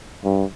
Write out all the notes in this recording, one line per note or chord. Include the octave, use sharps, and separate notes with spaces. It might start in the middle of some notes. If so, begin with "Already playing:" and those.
G2